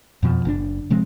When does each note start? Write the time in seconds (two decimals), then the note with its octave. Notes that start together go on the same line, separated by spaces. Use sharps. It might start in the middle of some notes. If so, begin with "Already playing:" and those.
0.23 F2 B2 F3
0.45 F#1 C#4 D4
0.90 C3 F3 G#3 C4